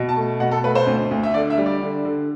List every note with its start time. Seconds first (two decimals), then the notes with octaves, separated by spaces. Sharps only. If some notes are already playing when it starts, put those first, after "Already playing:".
Already playing: B2
0.09 A5
0.16 A3
0.40 B2 F#5
0.51 A4
0.64 A3 B4
0.75 C5
0.87 D2
1.11 D2
1.23 E5
1.34 D3 D5
1.50 E5
1.58 G3
1.66 D5
1.82 D3
2.05 D3